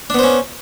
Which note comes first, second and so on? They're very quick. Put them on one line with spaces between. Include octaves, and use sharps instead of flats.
D4 B3 C5 C#4